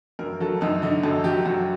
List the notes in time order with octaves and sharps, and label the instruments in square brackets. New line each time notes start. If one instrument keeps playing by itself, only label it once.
[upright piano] F#2 A#4
F#3 A4
F#2 D#4
D3 D#4
F#2 A4
F#3 G4
F#2 F#4